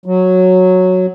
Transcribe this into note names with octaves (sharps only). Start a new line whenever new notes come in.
F#3